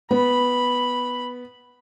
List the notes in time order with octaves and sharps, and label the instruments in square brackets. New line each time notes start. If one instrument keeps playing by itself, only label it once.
[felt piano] B3 [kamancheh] B5